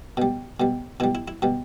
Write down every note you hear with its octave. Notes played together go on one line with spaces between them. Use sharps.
B2 G3
B2 G3
B2 G3 E4
E4
E4
B2 G3